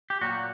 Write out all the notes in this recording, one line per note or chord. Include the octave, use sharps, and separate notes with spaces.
G4
A#2 F#3 A#3 F#4